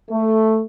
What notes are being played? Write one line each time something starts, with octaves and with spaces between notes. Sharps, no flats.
A3